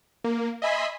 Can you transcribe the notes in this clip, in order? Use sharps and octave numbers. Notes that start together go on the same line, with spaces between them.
A#3
D#5 E5 G#5 B5 C6 B6